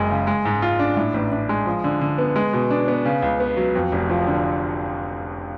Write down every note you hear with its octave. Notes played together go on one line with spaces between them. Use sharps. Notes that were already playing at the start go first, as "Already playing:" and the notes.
Already playing: F#1 F#2 G#3
C#3
G#3
G#2
F4
D4
A2
A1
D4
G#3
F3
D3
D3
B3
G#3
B2
D4
B3
C#3
C#2
B3
F#3
F2
F1
F3
D3